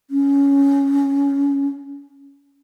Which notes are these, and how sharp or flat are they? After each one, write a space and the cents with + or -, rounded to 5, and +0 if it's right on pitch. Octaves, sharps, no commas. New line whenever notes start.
C#4 +10